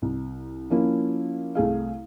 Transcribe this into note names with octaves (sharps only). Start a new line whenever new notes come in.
C2
F3 A#3 C#4 E4
C2 A3 G#4 F5